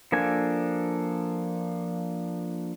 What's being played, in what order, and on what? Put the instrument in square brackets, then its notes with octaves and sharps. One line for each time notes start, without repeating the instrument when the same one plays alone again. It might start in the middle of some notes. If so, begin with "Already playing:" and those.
[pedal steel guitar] F3 A#3 D4 A4 G#5